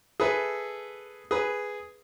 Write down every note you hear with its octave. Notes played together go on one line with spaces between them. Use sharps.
G#4 A4 B4 E5
G#4 B4